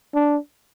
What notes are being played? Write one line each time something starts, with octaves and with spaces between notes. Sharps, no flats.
D4